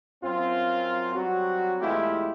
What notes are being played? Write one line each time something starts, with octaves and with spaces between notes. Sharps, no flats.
F#2 C4 F4
F#3 G3 C4 F#4
E2 G#3 A3 E4 F4 G4